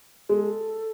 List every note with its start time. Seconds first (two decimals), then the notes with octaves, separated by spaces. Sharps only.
0.29 G#3 A4